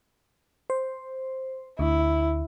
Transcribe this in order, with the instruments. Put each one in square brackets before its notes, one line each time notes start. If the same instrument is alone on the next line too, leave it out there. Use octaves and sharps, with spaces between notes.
[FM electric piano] C5
[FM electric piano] D2 [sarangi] E4